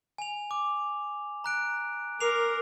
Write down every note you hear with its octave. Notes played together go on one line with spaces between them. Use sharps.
G#5 F7
D6
A#5 F#6 D7
A#4 D6 C7 F7